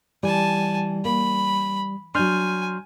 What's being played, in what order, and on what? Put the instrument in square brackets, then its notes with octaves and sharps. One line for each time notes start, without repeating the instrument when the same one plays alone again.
[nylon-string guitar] E3 [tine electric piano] G3 [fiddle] G#5 A5
[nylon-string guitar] A#3 [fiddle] B5
[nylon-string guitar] F#3 D4 [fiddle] G#5 [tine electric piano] C6 F6 G6